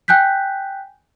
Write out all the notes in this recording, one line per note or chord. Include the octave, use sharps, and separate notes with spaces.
G5 G#5 F#6 G6 B6